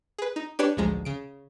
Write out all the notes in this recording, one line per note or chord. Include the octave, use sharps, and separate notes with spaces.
G#4 B4
D#4
D4 G4 B4 C#5 D5
A1 D2 F3 G#3 A#5
C#3 D7